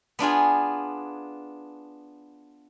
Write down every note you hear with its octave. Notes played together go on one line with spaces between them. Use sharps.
B3 D4 F4 G#4